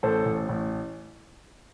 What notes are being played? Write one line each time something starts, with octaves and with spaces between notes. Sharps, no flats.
A1 A4 C5
A1
A1